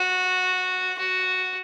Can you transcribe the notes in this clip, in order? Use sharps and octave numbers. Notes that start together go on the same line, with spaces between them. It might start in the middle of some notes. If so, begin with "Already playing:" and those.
Already playing: F#4
F#4